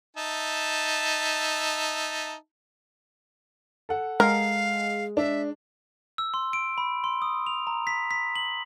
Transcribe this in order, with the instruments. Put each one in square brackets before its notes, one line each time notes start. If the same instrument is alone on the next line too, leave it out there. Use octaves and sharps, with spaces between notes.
[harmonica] D#4 E5 A5
[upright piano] A4 F#5
[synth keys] G#3 [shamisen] A#4 [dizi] F5
[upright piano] D4 [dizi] E5
[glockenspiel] E6
C6
D7
B5
C6
D#6
F7
A#5
B6
B6
F#7